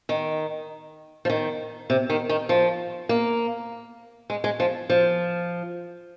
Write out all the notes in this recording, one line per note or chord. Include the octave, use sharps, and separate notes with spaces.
D#3
F3
D#3
C3
D#3
D#3
F3
A#3
G#3
G#3
F3
F3